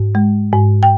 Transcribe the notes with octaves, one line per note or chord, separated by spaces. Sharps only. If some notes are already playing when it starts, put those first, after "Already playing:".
Already playing: G#2
G#3
G#2
G5